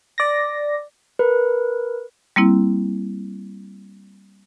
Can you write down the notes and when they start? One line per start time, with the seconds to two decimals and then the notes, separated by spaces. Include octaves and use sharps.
0.18 D5 A#6
1.19 A#4 B4
2.36 G3 A#3 C4 E4